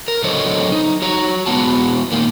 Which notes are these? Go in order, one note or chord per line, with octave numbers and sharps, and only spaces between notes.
A#4
D3 F#3 A4 C5 C#5 D#5
D#4
F#4 C#5 A#5
G#3 B3 F#4 A5
A#2 D#3 A#3